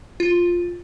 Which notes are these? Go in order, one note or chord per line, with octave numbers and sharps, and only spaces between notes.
F4